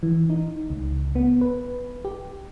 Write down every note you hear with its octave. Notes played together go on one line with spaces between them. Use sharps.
E3
D#4
C#2
B3
B4
G4